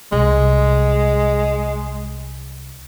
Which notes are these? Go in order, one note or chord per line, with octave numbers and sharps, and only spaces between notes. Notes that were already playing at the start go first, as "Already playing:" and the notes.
C2 G#3